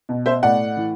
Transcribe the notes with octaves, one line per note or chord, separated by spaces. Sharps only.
B2
C5 E5
A2 D5 F#5
E3